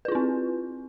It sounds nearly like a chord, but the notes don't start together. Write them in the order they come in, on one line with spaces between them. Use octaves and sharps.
B4 F4 E4 C4